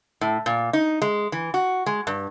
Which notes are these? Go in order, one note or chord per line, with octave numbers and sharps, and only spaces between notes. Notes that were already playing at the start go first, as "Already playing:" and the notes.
A2
A#2
D#4
G#3
E3
F#4
G#3
G2